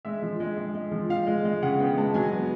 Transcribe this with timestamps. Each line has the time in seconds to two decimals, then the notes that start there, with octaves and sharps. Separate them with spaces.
0.05 G#3 E5
0.22 F3
0.40 G#3
0.58 G#3
0.75 G#3
0.92 F3
1.09 F3 F5
1.27 G#3
1.45 G#3
1.62 C#3 F#5
1.79 B3 G5
1.98 G#3 A5
2.14 F#3 G#5
2.33 B3